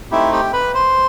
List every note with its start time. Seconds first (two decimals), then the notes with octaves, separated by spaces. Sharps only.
0.11 A3 C4 D#4 E4 G4 E5
0.33 G4 G5
0.53 B4 B5
0.74 C5 C6